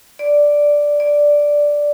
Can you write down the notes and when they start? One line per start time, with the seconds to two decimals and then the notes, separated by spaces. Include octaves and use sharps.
0.19 D5
1.00 D5